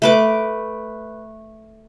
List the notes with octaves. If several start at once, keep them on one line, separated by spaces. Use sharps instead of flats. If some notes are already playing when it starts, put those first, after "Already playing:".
A3 B4 D6